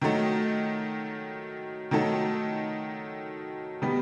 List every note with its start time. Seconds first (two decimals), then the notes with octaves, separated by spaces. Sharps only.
0.01 D#3 F#3 A3 D#4
1.91 D#3 F#3 A3 D#4 A4
3.82 D#3 G3 B3